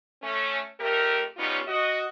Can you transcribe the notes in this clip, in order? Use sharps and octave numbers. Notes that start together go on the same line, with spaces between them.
A3 C#4
F2 A3 G4 A#4
F#3 G3 B3 C#4 D#4 F4
F#4 D#5